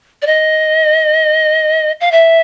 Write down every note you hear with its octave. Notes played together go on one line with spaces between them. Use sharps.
D5
D#5
F5
E5